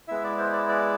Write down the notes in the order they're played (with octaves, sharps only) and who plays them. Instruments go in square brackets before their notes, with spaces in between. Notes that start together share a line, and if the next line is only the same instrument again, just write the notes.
[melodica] G#3 B3 E4 E5
D5
C5
D5
D5